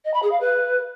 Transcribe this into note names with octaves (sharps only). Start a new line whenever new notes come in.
D#5
B5
G#4
F5
B4